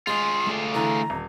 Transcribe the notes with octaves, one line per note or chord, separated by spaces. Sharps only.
G#3 F4 G#4 C6
A3 D5
D3 E3 A#5
D#1